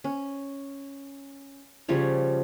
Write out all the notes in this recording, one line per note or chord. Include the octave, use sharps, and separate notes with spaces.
C#4
C#3 F3 G3 C#5